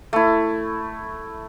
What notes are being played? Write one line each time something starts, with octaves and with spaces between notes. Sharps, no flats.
A3 E4